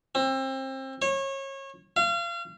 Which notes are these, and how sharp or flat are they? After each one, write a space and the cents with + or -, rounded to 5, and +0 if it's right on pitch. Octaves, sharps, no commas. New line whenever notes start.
C4 +30
C#5 -30
F5 -35